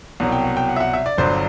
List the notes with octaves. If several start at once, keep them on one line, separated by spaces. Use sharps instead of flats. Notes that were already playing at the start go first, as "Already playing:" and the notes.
C2 B2 F#3 F#5
G5
F#5
G5
F#5
E5
F#5
E5
D5
G1 G2 F#3 C5